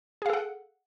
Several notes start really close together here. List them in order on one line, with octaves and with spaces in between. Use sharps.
G#4 F5 A4 F#5